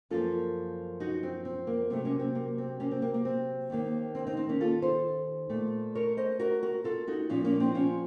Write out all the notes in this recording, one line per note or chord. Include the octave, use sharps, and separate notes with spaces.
F#2 F3 A#3 F4 A4
D#4 F#4
C4
C4
A#3
C3 F#3 A3 C4
A#3 C#4
C4
A#3
C4
A#3 C#4
C4
A#3
A#3
C4
D#2 D#3 A#3
C4
C4 D#4
C4
A#3 C#4
F4 A4
A4 C5
A#2 A3
A#4 C#5
C5 D#5
F#4 A#4
F#4 A#4
F4 A4
D#4 F#4
A#2 F3 A#3 C#4 F4
A#3 C#4
C4 D#4
C#4 F4